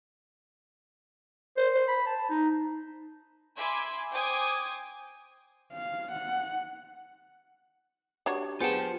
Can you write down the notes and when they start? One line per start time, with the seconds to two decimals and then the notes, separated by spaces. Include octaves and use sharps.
1.57 C5
1.75 C5
1.88 B5
2.06 A5
2.30 D#4
3.58 E5 G#5 B5 C6 D6 G#6
4.11 C5 G5 G#5 D6 D#6 G#6
5.73 F5
6.12 F#5
8.26 D4 F#4 G4 C#5
8.60 B3 F4 G#4 C5 F#5 G5 A5